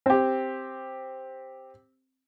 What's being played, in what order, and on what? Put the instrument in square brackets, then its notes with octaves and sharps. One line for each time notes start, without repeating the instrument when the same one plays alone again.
[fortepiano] C4 G4